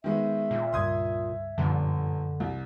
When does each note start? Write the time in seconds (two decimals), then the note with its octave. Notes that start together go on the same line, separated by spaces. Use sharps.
0.04 D#3 G#3 B3 E5
0.51 A#2
0.73 C#2 G2 C6 D#6 G#6
1.58 G1 F#2 A#2 D3 F3
2.40 C2